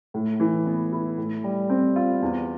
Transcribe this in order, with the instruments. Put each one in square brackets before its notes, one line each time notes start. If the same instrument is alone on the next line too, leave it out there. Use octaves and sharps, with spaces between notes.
[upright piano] A2
E3
B3
E4
A2
G3
C4
F4
E2